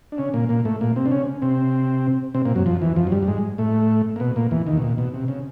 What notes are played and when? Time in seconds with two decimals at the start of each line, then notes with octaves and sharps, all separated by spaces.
0.12 D4
0.18 C#3 C#4
0.34 A#2 A#3
0.49 A#2 A#3
0.65 A2 A3
0.81 A#2 A#3
0.96 C3 C4
1.06 D4
1.11 C#3 C#4
1.42 C3 C4
2.34 C3 C4
2.45 A#2 A#3
2.55 F#2 F#3
2.66 F2 F3
2.82 E2 E3
2.96 F2 F3
3.07 F#3
3.12 G2 G3
3.23 G3
3.27 G#2 G#3
3.58 A2 A3
4.16 A#3
4.20 B2 B3
4.36 A#2 A#3
4.51 E2 E3
4.67 D#2 D#3
4.77 B2
4.82 A#2
4.98 B2
5.14 C3
5.28 C#3